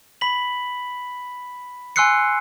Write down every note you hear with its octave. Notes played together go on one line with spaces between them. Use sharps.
B5 B6 F#7
G#5 C6 E6 F#6 C7 C#7